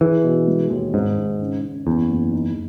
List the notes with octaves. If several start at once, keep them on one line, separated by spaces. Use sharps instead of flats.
E3 G#4
B2
G#3
D#2
G#1 G#2
G#1
C#3
C#3
F#1 E2
F#1
D#4